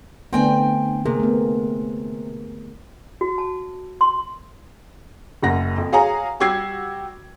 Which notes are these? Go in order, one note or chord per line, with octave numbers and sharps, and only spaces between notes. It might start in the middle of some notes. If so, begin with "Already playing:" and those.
D3 A3 B3 C4 G5 G#5
C3 A#3 G#4 A#4
A3 B3
F#4
A5
C6
F#1 F#2 F#5 A#6
F2
F#4 G#4 C#5 F5 G#5 A#5
G3 F#4 G4 E6 G#6 C7